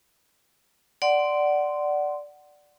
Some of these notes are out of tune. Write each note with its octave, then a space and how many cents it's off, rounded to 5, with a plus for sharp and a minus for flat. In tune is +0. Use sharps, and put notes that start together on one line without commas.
D5 +0 F#5 +15 C6 -10